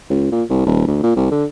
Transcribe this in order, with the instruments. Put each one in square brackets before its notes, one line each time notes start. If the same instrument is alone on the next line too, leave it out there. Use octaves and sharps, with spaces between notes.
[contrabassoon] C#2
A#2
C2
D#1
D2
A#2
C2
D3